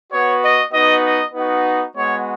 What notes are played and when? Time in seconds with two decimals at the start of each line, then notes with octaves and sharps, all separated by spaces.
0.12 B3 F#4 C#5
0.43 D#5
0.73 B3 D#4 F#4 D#5
1.04 D#5
1.34 B3 D#4 F#4
1.96 G#3 B3 F#4 C#5